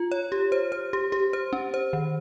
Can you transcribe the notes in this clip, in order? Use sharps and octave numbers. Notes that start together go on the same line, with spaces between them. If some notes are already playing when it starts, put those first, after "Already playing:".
Already playing: F4
C#5
G4
C5
C5
G4
G4
C5
C#4
C5
D#3